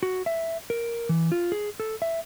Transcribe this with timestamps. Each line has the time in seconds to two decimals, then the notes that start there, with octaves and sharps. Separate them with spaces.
0.03 F#4
0.26 E5
0.70 A#4
1.09 E3
1.32 F4
1.52 G#4
1.80 A4
2.02 E5